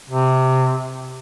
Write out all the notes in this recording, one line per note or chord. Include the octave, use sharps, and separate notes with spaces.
C3